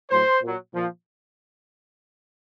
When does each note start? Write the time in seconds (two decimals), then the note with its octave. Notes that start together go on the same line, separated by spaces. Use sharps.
0.11 A2 F#3 C5
0.42 A#2 F#3
0.74 A#2 F3